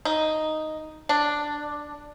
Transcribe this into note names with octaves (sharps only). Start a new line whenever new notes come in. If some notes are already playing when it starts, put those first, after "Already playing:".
D#4
D4